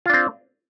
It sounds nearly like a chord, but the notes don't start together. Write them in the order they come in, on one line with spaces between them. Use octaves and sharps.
F4 D4 C4